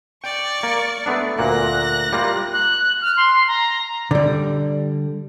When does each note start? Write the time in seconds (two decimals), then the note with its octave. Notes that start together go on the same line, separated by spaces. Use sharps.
0.24 D5 G5 C#6
0.63 A#3
1.06 A3 B3 D4
1.39 D2 A#2 A#3 F#6 A#6
2.12 G3 A#3 F4
2.53 F#6
3.01 F6
3.17 C6
3.48 A#5
4.11 D3 G3